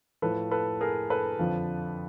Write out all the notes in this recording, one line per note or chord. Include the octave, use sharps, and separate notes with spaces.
A2 F3 A4 B4
A4 B4
G#4 A#4
A4 B4
F2 D3 F3